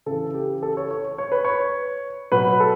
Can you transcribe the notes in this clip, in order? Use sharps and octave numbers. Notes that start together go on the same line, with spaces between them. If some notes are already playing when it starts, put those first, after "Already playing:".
C#3 E3 A4
G4
A4
C#5
C#5
C#5
B4
C#5
B2 F#3 B4
A4